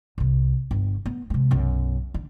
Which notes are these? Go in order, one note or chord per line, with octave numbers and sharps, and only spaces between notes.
C2 C3
G1
B3
C3 G#3
B1 F#2
D3